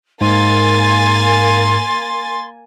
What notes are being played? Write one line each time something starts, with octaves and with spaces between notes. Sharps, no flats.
G#2 A#3 G#5 C6 A6